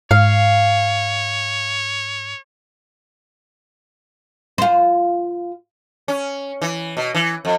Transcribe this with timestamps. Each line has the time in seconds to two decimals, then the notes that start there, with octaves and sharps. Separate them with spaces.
0.11 G#2 C#5 F5
4.58 F4 C5
6.08 C#4
6.62 E3
6.97 B2
7.15 E3
7.45 F2